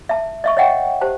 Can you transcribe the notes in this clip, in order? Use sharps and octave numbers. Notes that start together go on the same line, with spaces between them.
E5 A5
D#5 E5 C#6
C#5 D#5 E5 F#5 G5
G4 C5 A5